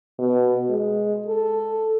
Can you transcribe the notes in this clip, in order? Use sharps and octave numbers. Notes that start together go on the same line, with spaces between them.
B2
G#3
A4